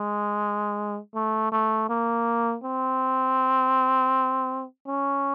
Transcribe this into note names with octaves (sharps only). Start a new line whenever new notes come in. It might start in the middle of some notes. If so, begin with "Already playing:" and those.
Already playing: G#3
A3
A3
A#3
C4
C#4